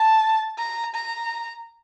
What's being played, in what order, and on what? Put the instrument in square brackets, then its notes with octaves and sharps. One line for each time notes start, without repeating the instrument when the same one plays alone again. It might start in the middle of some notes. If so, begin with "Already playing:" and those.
Already playing: [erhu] A5
A#5
A#5